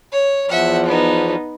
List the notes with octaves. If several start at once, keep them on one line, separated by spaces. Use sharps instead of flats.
C#5
E2 F3 E5 F#5
B3 D#4